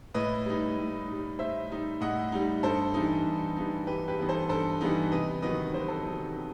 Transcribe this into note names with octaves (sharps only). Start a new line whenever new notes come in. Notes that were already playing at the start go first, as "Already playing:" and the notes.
A2 B4 D#5
G3 D#4
A2
G3 D#4
A2 C5 E5
G3 D#4
A2 D#5 F#5
G3 D#4
G2 A4 C5
E3 G3 B3 D#4
G2
E3 G3 B3 D#4
G2 G4 B4
G4 B4
E3 G3 B3 D#4
A4 C5
G2 A4 C5
E3 G3 B3 D#4
C3 B4 D#5
D#3 F#3 B3 D#4 B4 D#5
C3 C5
B4
A4 C5
D#3 F#3 B3 D#4
C3